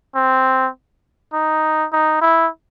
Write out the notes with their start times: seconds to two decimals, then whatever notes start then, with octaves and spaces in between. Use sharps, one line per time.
0.15 C4
1.33 D#4
1.93 D#4
2.21 E4